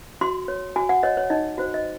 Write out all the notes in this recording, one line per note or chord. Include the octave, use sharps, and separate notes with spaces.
F#4 C6
C#5
F#4 G#5
F#5
C#5 D#5
C#5
D#4 D#5
F#4 C5
D#5